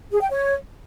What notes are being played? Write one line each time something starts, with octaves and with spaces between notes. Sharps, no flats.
G#4
G5
C#5